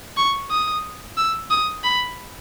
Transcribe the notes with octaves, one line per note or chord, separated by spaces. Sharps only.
C#6
D#6
E6
D#6
B5